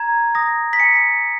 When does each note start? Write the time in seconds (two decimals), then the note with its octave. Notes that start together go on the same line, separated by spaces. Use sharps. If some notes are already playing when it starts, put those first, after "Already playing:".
Already playing: A#5 G#6
0.35 D#6 A#6
0.73 B6
0.80 G#5 C#7